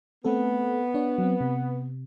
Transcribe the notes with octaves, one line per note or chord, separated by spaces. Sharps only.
A3 B3 C4 A4
D4 C#5
F#3 C4
C3